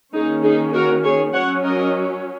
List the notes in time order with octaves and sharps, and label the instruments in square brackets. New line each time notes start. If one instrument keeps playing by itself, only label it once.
[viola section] D#3 A#3 C#4 D#4 G#4
D#4 G#4
F#4 A#4
G#4 C#5
F#3 C#4 C#5 F#5
A#4 D#5